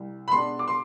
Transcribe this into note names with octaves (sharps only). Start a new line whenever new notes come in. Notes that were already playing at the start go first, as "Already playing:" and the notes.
Already playing: C2
B5
B2 G#3 D4 C6
D6
C6